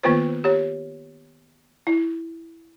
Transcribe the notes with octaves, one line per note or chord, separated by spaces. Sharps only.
D#3 A#3 B3 F4 B4 C5
G4 C#5
E4